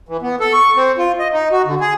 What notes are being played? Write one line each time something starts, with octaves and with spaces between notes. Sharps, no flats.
E3
B3
A4
C#6
C4
F4
D#5
D#4
F#4
D3
G#4